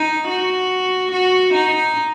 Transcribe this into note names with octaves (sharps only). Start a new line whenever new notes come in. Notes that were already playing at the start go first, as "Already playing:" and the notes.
Already playing: D#4
F#4
F#4
D#4